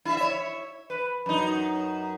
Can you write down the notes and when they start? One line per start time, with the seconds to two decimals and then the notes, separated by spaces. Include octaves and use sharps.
0.05 E4 E5
0.17 C#5 E5
0.90 B4
1.26 F#2 D#4